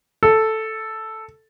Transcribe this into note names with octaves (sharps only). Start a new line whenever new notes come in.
A4